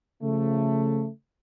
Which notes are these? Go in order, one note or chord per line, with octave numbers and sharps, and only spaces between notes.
C#3 F3 A3